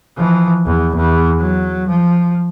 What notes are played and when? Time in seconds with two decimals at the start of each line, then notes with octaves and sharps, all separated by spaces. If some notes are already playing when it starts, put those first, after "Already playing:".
0.17 E3 F3
0.66 E2
0.95 E2
1.38 F#3
1.88 F3